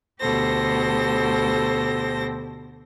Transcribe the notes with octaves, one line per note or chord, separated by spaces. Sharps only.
D2 B2 G4 A4 C5 A#6